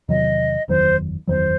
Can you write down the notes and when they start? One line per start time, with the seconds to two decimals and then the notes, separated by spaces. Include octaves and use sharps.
0.08 E2 C3 D#3 F#3 D#5
0.68 F#1 E2 D#3 F#3 C5
1.27 F#1 E2 D#3 F#3 C5